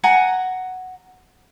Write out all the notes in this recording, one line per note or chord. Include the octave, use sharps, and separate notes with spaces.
F#5 G#5 A#5